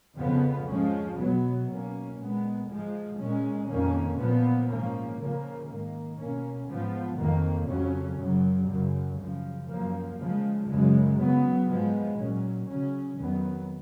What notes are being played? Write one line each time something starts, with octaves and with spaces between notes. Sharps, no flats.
F2 C#3 F3 B3
G#2 F3 G#3 C#4
B2 F#3 B3
B2 A#3 C#4
A#2 G#3 B3
G#2 F3 G#3
A#2 G#3 C#4
F2 D#3 A#3 C#4
A#2 F3 B3
G#2 F3 A#3 C#4
C#3 F3 A#3 C#4
G#2 D#3 A#3
B2 A#3 C#4
G#2 F3 B3
F2 D#3 A#3
F2 C#3 F#3 C#4
F#2 C#3 F#3
F#2 C#3 F#3
F#2 C#3 F3
F#2 F3 A#3
C#3 F3 G#3
F#2 C#3 G#3
C#3 F#3 B3
G#2 F3 G#3 B3
A#2 F#3 C#4
C#3 F#3 C#4
F2 D#3 F#3 B3